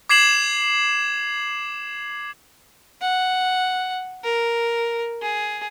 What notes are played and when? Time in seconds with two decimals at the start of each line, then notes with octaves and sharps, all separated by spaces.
0.09 D6 G#6 C7 E7 F#7
3.01 F#5
4.24 A#4
5.22 G#4